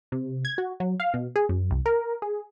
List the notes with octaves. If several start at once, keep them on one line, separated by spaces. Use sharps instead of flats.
C3
G#6
F#4
F#3
F5
B2
G#4
F#2
C2
A#4
G#4